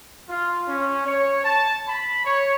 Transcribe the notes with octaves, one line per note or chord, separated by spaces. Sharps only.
F4
C#4
C#5
A5
B5
C#5